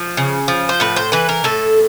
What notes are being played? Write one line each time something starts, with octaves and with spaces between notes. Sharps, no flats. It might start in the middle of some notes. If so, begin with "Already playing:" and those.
Already playing: F3
C#3
F3
C5
A2 B4
C5
E3 B4
A#4
A2 A4